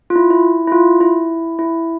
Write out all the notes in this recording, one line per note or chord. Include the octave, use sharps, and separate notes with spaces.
F4
E4
E4
E4
F4
E4
E4